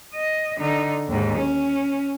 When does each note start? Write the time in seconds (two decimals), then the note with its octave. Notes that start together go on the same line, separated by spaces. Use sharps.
0.14 D#5
0.59 D3 D#4
1.08 D#2 G#2
1.37 C#4